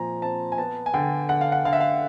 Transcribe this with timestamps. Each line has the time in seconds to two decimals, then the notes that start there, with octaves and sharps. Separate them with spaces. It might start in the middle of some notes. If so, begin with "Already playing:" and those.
Already playing: A#2 F3 C4 G#5 A#5
0.22 C4 A5
0.52 G#5
0.58 B3 A5
0.86 G#5
0.94 D3 G5
1.29 D3 F#5
1.41 F5
1.52 F#5
1.65 D3 F5
1.73 E5
1.80 F5